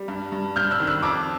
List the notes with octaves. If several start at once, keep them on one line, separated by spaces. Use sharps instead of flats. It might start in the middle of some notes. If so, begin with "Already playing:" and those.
Already playing: G3
G2
G2
G2 F6 G6
E6 F#6
D#3
E6 F#6
F2 D6 E6